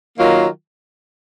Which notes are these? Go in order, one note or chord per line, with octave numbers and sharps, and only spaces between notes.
D#3 F#3 A#3 F4